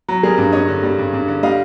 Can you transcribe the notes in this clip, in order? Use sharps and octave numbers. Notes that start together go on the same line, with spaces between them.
F#3
G3 G#4 A#4
G2
G2 C#5 D#5
D3
G3
G2
G2
D3
G3 D#5 F5